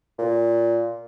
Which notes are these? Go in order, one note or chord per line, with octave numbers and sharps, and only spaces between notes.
A#2